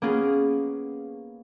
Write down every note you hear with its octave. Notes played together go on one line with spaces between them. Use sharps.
A#3 B3 C#4 F4 G#4